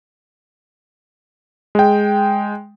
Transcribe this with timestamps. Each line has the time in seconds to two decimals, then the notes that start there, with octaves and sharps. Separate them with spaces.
1.75 G#3 G5